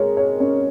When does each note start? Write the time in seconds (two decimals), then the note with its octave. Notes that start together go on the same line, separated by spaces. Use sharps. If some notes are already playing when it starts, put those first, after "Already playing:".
Already playing: G#3 A#4 C#5
0.17 C#5
0.40 C#4